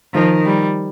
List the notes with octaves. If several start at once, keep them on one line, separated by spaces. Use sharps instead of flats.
D#3 F3
G3